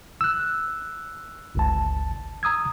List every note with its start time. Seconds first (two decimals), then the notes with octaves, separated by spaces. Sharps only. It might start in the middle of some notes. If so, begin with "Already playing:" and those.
0.21 E6 F#6
1.55 G1 C#2 A5
2.43 A#5 D#6 E6 G#6